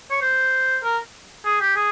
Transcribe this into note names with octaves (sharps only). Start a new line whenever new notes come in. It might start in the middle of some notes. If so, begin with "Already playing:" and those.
C#5
C5
A#4
G#4
G4
G#4